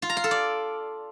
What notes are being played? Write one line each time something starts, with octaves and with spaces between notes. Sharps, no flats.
F4
A#5
F5
A4
D5